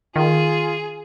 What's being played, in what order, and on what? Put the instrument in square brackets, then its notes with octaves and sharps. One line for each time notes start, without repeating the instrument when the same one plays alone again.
[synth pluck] D#3 [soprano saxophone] F4 [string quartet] G#4